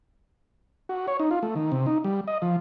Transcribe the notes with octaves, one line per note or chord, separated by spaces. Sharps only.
F#4
C#5
D#4
F4
A3
D#3
C3
D#4
G3
D#5
F3